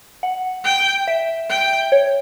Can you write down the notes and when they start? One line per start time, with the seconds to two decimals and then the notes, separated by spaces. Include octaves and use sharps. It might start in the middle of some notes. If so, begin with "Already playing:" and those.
0.23 F#5
0.64 G5
1.08 E5
1.50 G5
1.92 C#5